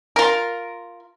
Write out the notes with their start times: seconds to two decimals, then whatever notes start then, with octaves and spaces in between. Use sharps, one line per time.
0.16 F4 A#4